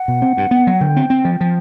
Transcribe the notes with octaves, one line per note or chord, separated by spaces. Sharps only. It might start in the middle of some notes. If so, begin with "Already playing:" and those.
Already playing: F#5
B2
C4
G2
B3
F#3
D3 G5
C4
C4
F3
F3